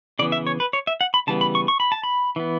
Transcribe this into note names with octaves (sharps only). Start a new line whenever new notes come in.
C#3 E3 B3 D5
E5
C#5
B4
C#5
E5
F#5
B5
C#3 E3 G3 B3 A5
B5
C#6
C#6
B5
A5
B5
E3 B3